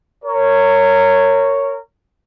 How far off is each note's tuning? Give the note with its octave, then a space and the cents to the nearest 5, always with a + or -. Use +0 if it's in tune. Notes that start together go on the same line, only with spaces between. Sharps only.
A#4 -25 C#5 +0